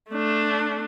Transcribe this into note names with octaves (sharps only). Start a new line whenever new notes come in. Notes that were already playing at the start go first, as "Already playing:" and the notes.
A3 D4